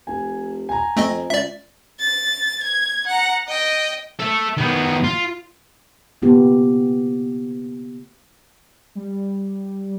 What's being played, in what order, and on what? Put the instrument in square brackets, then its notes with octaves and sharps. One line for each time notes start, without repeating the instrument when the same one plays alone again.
[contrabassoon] F1 [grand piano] G#5
[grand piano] G#5 A#5
[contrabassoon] F2 [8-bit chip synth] A3 C4 D#5
[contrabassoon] C#2 [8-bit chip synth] D5 E5
[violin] A6
G#6
F#5 A#5
D#5 G5
[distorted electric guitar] A4 E5
D#3 B3
F4
[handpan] C#3 A#3 B3 F4 G4
[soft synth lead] G3